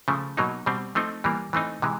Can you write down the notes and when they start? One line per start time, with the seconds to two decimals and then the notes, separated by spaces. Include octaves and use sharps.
0.08 C#3 F3 A3
0.37 B2 F#3 A#3 D#4
0.66 B2 G3 C4
0.95 F3 A3 C4 D#4
1.24 E3 G3 A#3
1.53 E3 A3 C4 D#4
1.82 C3 E3 G#3